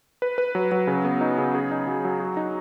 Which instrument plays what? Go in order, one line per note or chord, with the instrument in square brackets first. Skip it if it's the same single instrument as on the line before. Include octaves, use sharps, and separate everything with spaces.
[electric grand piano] B4
B4
F#3
F#3
C#3
B3
D#4
C#3
G#4
D#4
F#3
F#3
F#4
D#4